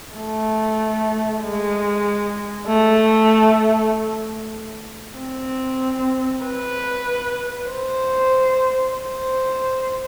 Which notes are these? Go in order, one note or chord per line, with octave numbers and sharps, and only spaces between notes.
A3
G#3
A3
C4
B4
C5
C5